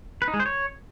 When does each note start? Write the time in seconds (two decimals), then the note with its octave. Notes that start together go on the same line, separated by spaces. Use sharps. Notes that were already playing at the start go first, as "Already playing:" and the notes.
0.22 B4
0.28 D#4
0.34 G#3
0.40 C5
0.46 C#5